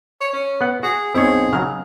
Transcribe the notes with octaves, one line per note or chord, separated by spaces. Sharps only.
C#5
C#4
B3 F#5
F#4 G#4
B1 C4 E4 G#4 C#5
C#3 F#3 F6